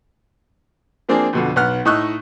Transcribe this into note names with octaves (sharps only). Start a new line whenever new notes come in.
F3 A#3 C4 D4 G#4
F2 B2 D3
B1 B3 F#5 F6 F#6
A2 D#4 D#5 C#6 E6 F#6